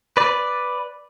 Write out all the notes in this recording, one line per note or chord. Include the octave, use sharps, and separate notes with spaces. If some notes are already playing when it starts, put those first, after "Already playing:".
B4 D5